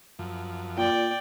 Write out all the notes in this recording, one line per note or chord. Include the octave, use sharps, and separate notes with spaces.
F#2 F3
A#2 D5 G5